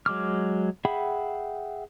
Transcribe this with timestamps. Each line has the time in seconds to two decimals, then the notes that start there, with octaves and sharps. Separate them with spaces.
0.06 F#3 G#3 D6 F6
0.85 G#4 E5 F#5 G5 B5